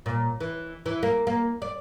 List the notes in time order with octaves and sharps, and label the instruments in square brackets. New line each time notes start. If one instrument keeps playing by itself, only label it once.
[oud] A#2
E3
E3
A#3
A#3
D5